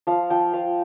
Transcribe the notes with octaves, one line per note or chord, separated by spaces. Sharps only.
F3 F5
F3 G5
F3 F5